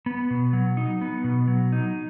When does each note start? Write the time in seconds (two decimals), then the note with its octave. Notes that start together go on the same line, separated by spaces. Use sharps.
0.06 B3
0.30 B2
0.53 F#3
0.77 D#4
1.01 B3
1.24 B2
1.48 F#3
1.73 D#4